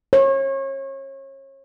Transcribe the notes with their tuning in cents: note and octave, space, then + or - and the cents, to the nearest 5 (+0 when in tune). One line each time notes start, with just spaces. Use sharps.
C#5 -35